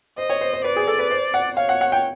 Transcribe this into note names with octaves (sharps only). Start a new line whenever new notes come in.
C5 D#5
C#5
C5
C5
B4 D5
G#4
A4
B4
C5
F#5
C#5 F5
F#5
F#5
G5